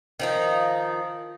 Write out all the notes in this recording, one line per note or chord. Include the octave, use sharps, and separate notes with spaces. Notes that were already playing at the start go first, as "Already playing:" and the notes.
D#3 F3 D#4